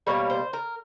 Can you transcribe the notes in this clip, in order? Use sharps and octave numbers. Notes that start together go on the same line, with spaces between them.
B2 G3 A#3 C#5
C5
A#4